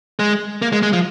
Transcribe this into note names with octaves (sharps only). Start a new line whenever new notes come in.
G#3
A#3
G#3
G#3
F3